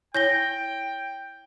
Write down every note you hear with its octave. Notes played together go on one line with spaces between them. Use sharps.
E4 C#5 G5 G#5 G6 A#6 G7